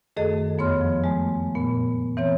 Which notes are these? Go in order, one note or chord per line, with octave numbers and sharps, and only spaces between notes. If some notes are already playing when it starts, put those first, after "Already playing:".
F#2 D#3 A3 G#4 A4 D#5
F2 B3 C#5 C6 F6
F3
G#3 A3
A#2 B3
E3 C4 C#5